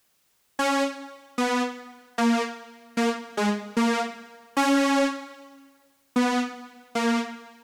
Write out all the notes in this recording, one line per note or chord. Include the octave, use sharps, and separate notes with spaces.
C#4
B3
A#3
A#3
G#3
A#3
C#4
B3
A#3